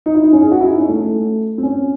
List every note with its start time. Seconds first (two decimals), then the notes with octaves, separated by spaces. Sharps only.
0.06 D#4
0.14 E4
0.24 D#4
0.33 C#4
0.42 G#4
0.52 F#4
0.61 E4
0.70 D#4
0.80 C#4
0.89 A3
1.58 C4
1.63 C#4